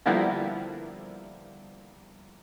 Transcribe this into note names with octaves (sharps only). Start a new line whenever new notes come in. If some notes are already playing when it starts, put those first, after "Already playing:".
D3 F3 G3 A#3 B3 E4